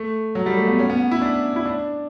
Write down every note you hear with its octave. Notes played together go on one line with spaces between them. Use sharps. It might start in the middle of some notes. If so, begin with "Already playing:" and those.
Already playing: A3
F#3
G3
A3
B3
C#4
B3
E4
D4
E4
D4